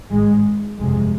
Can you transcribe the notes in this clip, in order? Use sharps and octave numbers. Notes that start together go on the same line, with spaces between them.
G#1 G#2 G#3
G1 F2 C3 G#3